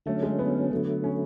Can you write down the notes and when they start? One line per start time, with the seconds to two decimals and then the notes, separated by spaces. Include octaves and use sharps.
0.06 D3 F#3 A3 C#4
0.23 G#3
0.39 B3
0.72 D3 F#3 A3
1.04 C#4